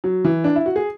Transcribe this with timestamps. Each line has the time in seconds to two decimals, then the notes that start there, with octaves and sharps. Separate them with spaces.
0.04 F#3
0.24 E3
0.44 D4
0.56 E4
0.66 F#4
0.76 G#4